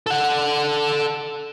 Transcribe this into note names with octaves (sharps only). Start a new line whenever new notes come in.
A4 F#5